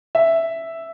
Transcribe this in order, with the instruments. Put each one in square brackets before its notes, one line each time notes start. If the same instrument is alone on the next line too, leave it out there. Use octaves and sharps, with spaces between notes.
[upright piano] E5